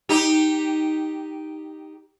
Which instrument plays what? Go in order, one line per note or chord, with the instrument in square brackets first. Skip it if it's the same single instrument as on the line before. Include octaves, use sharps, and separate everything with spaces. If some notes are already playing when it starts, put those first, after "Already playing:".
[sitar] D#4 G4